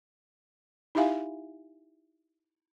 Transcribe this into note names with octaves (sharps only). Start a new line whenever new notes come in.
D#4 E4 G4 E5 F5 G#5